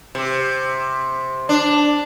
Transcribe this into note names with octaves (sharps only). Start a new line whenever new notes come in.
C3
D4